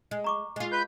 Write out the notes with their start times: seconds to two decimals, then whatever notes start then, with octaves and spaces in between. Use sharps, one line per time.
0.11 G#3
0.24 A#5 C#6 D6
0.56 G#3 F4
0.72 B4 G6